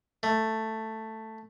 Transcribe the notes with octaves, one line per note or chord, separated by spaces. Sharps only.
A3